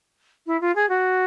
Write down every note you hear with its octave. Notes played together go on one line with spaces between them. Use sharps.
E4
F4
G#4
F#4